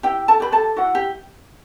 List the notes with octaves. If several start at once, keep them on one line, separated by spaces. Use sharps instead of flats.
E4 G4 G5
A4 A5
G4 B4 B5
A4 A5
E4 F#4 F#5
G4